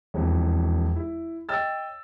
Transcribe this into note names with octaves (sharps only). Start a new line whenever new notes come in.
E1 F2 E3
E4
C#5 D#5 G5 E6 A6